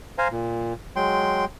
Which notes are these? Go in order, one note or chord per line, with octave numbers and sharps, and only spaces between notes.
C5 F5 G#5 A#5
A#2
F#3 G#3 G5 C6